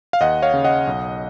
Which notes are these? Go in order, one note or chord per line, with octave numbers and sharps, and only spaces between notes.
F5
D#2 D#5 F#5
C#5 F5
C#3
D#5 F#5
B1